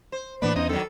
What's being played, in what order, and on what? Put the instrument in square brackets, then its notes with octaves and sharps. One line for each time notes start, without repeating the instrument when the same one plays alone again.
[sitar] C5
[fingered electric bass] A2 E3 A#3 [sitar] B3 D4 D5 [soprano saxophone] B4
[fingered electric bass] E2 B3 C#4 [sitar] E3 D#4 [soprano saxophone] D#5
[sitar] D#3 F#3 [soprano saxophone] A4